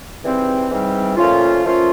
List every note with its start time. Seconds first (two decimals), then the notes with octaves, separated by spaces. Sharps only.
0.23 G#2 E3 G3 C4
0.69 G#2 E3 G3 C4
1.17 A#2 F3 A3 C#4 F4
1.64 A#2 F3 A3 C#4 F4